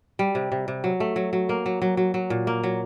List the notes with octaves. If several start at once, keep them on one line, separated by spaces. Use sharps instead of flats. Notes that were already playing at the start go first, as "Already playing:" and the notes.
G3
C3
C3
C3
F#3
A3
F#3
F#3
A#3
F#3
F#3
F#3
F#3
A#2
A#3
F#3